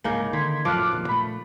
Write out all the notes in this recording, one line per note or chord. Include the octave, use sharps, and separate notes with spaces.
C2 G#2 C#3 A#3 D#4
D3 D#3 C6 G#6 B6
F2 A2 F3 F#3 D6 F6 F#6
F1 A#1 D#2
A#2 A3 B5